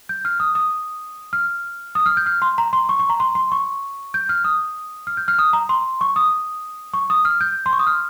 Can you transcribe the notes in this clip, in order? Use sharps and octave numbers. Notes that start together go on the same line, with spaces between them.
G6
F6
D#6
D#6
F6
D#6
F6
G6
F6
C6
A#5
C6
C#6
C#6
A#5
C6
C6
C#6
G6
F6
D#6
F6
G6
F6
D#6
A#5
C6
C#6
D#6
C#6
D#6
F6
G6
C6
C#6
D#6
F6